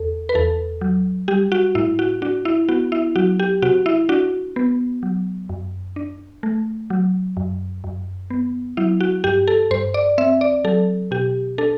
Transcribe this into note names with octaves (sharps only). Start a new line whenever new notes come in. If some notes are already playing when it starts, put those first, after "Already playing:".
Already playing: E2 A4
B4
E2 A4
F#3
G3 G4
F#4
A2 E4
F#4
D4 F#4
E4
B3 F#4
E4
F#3 F#4
G4
C3 F#4
E4
D4 F#4
B3
F#3
F#2
D4
A3
F#3
F#2
F#2
B3
F#3 E4
F#4
G2 G4
A4
G2 C5
D5
C4 E5
D5
F#3 A4
B2 G4
D4 A4